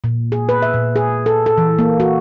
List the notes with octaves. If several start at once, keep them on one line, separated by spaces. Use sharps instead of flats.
A#2
G#4
B4
E5
A#2
G#4
A4
A4
E3
A#3
F#4